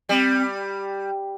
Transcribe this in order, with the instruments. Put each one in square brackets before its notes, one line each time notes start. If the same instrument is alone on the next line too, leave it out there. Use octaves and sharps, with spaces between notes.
[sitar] G3 [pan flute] C4